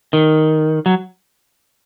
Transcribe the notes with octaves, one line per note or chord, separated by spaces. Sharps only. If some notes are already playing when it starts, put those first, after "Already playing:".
D#3
F#3